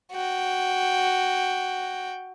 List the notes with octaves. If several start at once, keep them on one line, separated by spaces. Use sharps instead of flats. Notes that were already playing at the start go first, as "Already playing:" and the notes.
F#4 G5